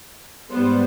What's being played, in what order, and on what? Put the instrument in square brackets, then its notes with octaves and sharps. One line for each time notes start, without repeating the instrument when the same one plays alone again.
[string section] G#2 G3 B3 C5